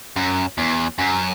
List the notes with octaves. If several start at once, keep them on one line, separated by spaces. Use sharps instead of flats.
F#2
E2
F#2